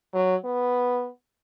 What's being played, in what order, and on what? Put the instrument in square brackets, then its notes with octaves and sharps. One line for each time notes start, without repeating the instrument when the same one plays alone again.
[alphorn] F#3
B3